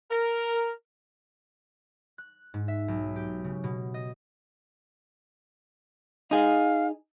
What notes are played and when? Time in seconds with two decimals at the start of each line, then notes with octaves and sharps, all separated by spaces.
0.11 A#4
2.18 F#6
2.54 G#2
2.68 E5
2.88 B1
3.16 G4
3.44 C#3
3.64 B2
3.94 D#5
6.31 D#4 G#4 F5